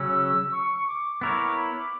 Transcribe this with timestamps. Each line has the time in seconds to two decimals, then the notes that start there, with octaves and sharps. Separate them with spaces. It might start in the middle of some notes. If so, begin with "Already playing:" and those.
Already playing: C#3 F#3 C#4 E6
0.52 C#6
0.87 D6
1.21 B3 E4 A#4 C#5 D6
1.55 B5
1.80 D6